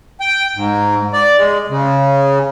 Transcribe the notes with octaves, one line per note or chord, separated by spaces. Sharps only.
G5
G#2
D5
G#3
C#3